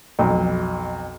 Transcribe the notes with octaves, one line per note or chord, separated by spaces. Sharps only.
B1 F2